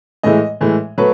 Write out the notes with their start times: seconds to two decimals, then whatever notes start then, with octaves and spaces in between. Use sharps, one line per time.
0.23 A2 E3 G#3 D#5
0.61 A2 E3 G#3
0.98 F#3 A3 B4